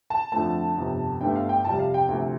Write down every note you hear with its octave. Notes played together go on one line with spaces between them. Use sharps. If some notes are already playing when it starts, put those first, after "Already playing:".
A5
F2 D3 F3 A3 A5
G1 F2 C3
G1 G2 D3 A3 G5
F5
G5
F2 C3 G3 A5
F5
G5
D2 C3 F3 A3